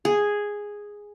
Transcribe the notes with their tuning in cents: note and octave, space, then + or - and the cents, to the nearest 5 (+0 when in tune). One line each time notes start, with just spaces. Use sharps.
G#4 -5